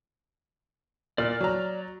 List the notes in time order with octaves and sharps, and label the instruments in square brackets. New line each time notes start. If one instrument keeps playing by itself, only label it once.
[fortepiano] A#2 [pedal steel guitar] D5 F6
[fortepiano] F#3 A#5